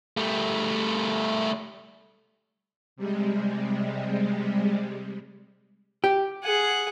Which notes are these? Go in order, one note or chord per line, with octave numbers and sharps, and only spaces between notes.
G3 A3
C3 G3 G#3
G4
G#4 F#5